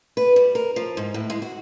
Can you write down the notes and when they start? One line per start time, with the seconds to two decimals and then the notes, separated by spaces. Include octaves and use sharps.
0.17 B4
0.36 G3
0.55 A#4
0.76 F3
0.97 G#2
1.14 A2
1.30 G#3
1.42 F#4